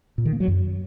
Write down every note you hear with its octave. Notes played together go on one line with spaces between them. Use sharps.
A#2
D#3
A#3
F#3
F#2